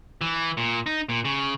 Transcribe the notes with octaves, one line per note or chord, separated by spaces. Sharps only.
E3
A#2
D#4
A#2
C#3